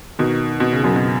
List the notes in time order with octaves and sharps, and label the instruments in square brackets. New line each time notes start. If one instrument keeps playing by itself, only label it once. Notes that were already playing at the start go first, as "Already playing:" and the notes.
[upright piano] B2 D#3
B2
C#3
F#2 B2
B2